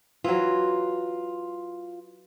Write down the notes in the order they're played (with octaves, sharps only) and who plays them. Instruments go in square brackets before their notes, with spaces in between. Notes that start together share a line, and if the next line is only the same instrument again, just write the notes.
[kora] E3 F#3 [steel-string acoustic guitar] F4